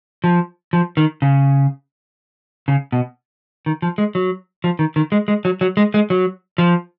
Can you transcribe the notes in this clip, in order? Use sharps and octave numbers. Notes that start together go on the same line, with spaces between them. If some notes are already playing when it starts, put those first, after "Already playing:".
F3
F3
D#3
C#3
C#3
B2
D#3
F3
G#3
F#3
F3
D#3
D#3
G#3
G#3
F#3
F#3
G#3
G#3
F#3
F3